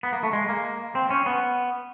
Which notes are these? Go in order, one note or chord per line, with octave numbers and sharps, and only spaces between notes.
B3
A#3
A3
G#3
A#3
C4
C#4
B3